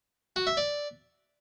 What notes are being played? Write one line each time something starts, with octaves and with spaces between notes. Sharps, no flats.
F#4
E5
D5